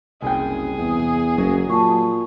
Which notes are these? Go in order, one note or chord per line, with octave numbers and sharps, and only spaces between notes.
F#1 C2 G#4 G5
E2
F#1 F#3
A#2 A5 C#6